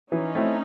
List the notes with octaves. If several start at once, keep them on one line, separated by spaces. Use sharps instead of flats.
E3 C#4 D#4
A3 C4 E4